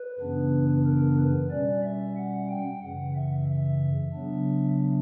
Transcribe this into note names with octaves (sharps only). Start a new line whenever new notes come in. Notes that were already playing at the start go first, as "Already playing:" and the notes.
Already playing: B4
F#2 C#3 E3 B3 D4
A#4
B4
B2 G3 C#4 D5
E5
F#5
G5
F#2 C#3 E3 F#5
E5
E5
C#3 F#3 B3 D4